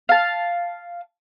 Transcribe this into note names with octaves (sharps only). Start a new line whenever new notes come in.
F5 A5